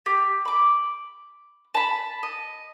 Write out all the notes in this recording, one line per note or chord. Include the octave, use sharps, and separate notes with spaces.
G4
B5 D6
A5 B5
D#5